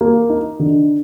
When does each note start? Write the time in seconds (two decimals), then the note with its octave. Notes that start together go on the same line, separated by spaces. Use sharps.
0.01 A#3
0.30 D#4
0.60 D3